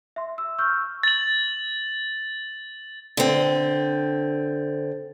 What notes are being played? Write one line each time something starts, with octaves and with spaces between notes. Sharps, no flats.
E5 C6
E6
C#6 E6 F6 G6
A6 F#7
D3 C4